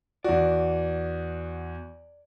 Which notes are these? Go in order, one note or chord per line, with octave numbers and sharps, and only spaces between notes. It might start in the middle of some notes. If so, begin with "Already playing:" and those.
E2 F#4 D5